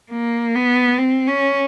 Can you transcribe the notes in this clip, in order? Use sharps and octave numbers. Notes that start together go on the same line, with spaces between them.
A#3
B3
C4
C#4